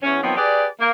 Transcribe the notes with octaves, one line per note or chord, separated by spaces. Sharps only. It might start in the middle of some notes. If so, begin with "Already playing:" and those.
E2 C#4
D#3 F3 F#3 B3 C4
G4 G#4 B4 D5
A#3